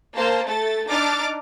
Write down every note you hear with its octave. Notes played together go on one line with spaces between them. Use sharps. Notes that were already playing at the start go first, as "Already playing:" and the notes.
A#3 C5 A5
A3 A4 A6
D4 D#4 D6 F6 A6